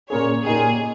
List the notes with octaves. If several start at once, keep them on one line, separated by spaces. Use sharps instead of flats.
A#2 A#3 C#4 G#4 C#5
A#2 A#3 D#4 G4 G#4